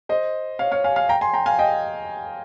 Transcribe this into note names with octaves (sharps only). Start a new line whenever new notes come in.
C5 D#5
C#5 F5
C#5 F5
F5 G#5
F5 G#5
G5 A#5
G#5 C6
G5 A#5
F5 G#5
D#5 G5